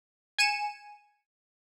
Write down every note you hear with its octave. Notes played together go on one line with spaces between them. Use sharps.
G#5 C#7 D#7 E7